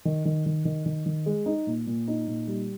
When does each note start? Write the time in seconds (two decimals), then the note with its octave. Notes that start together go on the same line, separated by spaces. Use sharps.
0.05 D#3
0.25 D#3
0.46 D#3
0.65 D#3
0.86 D#3
1.06 D#3
1.26 G#3
1.46 D#4
1.67 A#2
1.87 A#2
2.08 D#4
2.27 A#2
2.47 G3